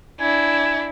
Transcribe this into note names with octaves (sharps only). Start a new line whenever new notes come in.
D4 E4 G#5